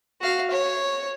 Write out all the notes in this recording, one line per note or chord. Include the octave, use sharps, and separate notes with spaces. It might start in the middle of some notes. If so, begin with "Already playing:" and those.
F#4 F5
C#5